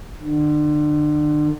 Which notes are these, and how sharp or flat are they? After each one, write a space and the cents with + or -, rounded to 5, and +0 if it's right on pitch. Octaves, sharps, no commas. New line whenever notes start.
D3 +35